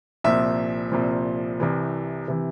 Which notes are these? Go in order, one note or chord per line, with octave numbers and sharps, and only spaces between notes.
C2 A#2 F3 E5
C2 A#2 F3
C2 C3 E3
C3 E3